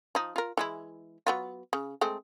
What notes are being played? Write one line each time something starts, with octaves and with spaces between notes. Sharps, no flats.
F3 D#4
F4 A#4
E3 G#3 E4
F#3 B3 F4
C#3
G#3 A3 C4